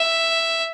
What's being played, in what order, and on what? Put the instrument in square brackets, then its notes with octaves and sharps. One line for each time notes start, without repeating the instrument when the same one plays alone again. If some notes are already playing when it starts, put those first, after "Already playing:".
Already playing: [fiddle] E5